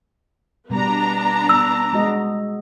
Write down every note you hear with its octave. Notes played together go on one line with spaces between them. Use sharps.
B2 G3 B3 D4 A#5
E6
G#3 F#4 D#5